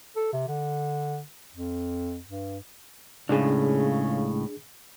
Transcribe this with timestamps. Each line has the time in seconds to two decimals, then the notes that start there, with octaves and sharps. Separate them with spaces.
0.16 A4
0.33 C3
0.48 D3
1.56 F2
2.26 G2
3.29 C#2 A2 C#3 D4 G#4